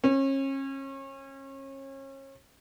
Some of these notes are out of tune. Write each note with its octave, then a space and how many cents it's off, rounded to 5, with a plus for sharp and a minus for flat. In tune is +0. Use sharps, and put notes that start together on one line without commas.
C#4 -35